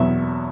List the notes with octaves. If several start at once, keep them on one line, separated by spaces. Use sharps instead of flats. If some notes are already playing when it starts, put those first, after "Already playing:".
Already playing: E2 B2 F#3 E5